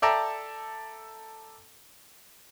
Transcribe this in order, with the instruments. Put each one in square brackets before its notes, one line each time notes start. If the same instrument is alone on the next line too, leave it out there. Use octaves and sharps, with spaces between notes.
[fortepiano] A4 D5 E5 G5 A5 A#5